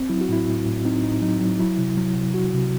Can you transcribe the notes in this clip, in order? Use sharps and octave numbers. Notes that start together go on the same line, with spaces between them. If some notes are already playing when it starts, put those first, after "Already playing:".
Already playing: C4
F#3 E4
F#4
A2 E4
A2
A2
C4 D#4
A2 D#4
F#3 D#4
F#3
F#3 E4
C3
F#3
C3
F#3 F#4
C3